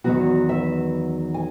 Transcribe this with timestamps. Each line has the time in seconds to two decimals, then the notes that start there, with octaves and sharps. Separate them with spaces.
0.04 E2 D#3 F#3 B3 F#4
0.49 E5
1.34 G#5